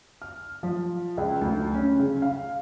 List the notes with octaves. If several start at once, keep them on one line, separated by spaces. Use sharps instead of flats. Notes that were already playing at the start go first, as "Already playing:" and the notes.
F6
F3
C#2
D2
C#4
C#3
F5